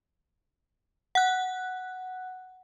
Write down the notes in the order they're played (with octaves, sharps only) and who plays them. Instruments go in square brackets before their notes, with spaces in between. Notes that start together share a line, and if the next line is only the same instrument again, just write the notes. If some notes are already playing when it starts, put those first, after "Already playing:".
[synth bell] F#5 F#6